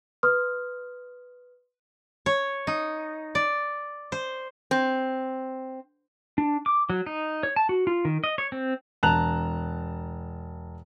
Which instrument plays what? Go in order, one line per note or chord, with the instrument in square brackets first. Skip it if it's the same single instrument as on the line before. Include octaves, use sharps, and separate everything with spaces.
[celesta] B4 C6 D#6 F6
[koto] C#5
D#4
D5
C5
[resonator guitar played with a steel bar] C4
[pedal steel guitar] D4
D6
F#3
D#4
C#5
A5
F#4
F4
D#3
D#5
C#5
C4
[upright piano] E1 A5 A#5 F#6 F7